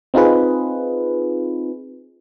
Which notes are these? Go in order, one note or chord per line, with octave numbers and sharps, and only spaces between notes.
C4 D#4 F4 G#4 B4